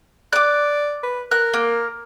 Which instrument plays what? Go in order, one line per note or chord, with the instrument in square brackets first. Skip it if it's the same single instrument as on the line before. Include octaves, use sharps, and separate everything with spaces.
[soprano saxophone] D5 [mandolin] D6 F#6
[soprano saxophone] B4
[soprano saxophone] A#4 [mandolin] F#6
[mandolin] A#3